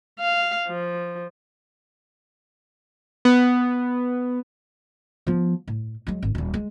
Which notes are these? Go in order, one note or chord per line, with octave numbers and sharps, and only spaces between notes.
F5
F3
B3
F3 B3
A2
F#3 G#3
G#1
D#1 G3
G#3